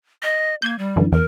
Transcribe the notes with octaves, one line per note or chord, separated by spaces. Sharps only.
D#5
A#3 G6 G#6
G3
F#2 D3 E3
E2 A#4